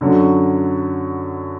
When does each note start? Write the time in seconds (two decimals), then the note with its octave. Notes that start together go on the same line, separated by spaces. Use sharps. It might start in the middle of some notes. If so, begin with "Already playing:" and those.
0.01 F#2 D3 F#3